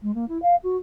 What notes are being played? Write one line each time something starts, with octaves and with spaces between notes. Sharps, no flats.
G#3
A#3
E4
F5
F#4